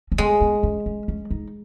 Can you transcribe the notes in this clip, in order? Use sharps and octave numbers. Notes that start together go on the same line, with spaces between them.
C#4
G#3 B3
B3
C#4
C#4
C#4
D#4